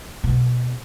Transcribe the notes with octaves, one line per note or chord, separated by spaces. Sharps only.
B2